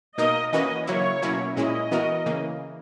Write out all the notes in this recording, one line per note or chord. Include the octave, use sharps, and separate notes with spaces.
B2 A#3 D#4 A#4 D#5
E3 A#3 C#4 F#4 B4 D#5
C#3 F#3 A#3 E4 C#5
B2 F#3 A#3 C#4 E4
A#2 G#3 C#4 E4 D#5
E3 B3 F#4 A#4
C#3 E3 A#3